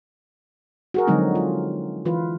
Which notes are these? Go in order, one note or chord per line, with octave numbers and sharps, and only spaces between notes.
F#4 G#4 A#4
D3 F3 F#3 G#3 C4 D#4
F4
E3 F4 B4